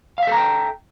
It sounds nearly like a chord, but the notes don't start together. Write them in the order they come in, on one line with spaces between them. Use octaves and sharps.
F5 E5 A4 A#5 G5